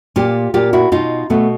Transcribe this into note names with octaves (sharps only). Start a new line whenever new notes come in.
A#2 F4 G4
A#2 F4 G4
E4 F#4
B2 D#4 F4
B2 A3 B3